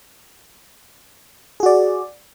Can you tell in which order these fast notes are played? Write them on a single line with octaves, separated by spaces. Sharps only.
G#4 F#4 D5